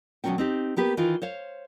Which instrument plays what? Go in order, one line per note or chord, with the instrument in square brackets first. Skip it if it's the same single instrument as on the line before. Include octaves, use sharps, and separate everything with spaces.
[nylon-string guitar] D2 B2 D#3 F#3 C#4 G5
C4 D#4 G4
A#3 B3 G4 B4
D#3 E3 D#4 F4
C5 C#5 F5